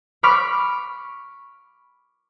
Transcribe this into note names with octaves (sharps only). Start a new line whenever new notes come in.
B5 C#6 D6 F6 B6